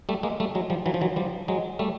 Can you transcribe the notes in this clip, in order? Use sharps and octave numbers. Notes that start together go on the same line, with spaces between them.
G3 A3
G#3 A#3
G3 A3
F#3 G#3
F3 G3
E3 F#3
F3
E3 F#3
F3 G3
F#3 G#3
G3 A3